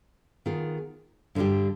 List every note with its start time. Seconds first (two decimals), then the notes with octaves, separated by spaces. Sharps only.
0.46 D#3 B3 F4 G#4
1.35 G2 D3 G3 D4 G4